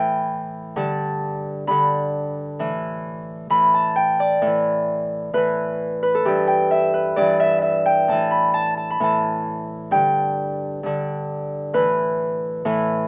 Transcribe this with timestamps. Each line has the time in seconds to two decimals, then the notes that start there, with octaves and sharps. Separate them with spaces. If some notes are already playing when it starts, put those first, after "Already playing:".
Already playing: A2 E3 G5
0.76 G2 D3 A5
1.67 G2 D3 B5
2.59 A2 E3
3.50 A2 E3 B5
3.74 A5
3.96 G5
4.20 D5
4.42 A2 E3
5.33 A2 E3 B4
6.03 B4
6.15 A4
6.25 G2 E3 G4
6.47 G5
6.71 E5
6.94 B4
7.16 G2 E3 D5
7.40 E5
7.62 E5
7.86 G5
8.08 A2 E3 A5
8.31 B5
8.54 A5
8.77 A5
8.90 B5
9.00 A2 E3 A5
9.91 G2 D3 G5
10.83 G2 D3
11.73 A2 E3 B4
12.65 A2 E3